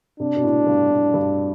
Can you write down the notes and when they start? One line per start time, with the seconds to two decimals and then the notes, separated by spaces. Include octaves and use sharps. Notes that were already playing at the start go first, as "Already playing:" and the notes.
0.20 C3 D4
0.36 B2
0.43 A2
0.67 G2
0.91 A2
1.14 G2